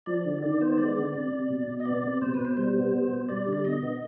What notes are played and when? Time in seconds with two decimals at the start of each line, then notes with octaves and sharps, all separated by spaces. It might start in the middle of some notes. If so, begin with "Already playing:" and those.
0.06 F3 D5
0.25 D3
0.42 D#3 D5
0.61 B3 C5
0.78 G#3 D5
0.96 D3
1.14 C3
1.32 C3
1.51 B2
1.68 B2
1.80 D#5
1.85 B3 D5
2.04 C3
2.22 B2 C5
2.34 B2 B4
2.45 C5
2.57 G3 C5
2.76 B3
2.93 B2
3.11 B2
3.29 G3 D5
3.47 D3
3.53 D5
3.64 B2 D#5
3.83 B3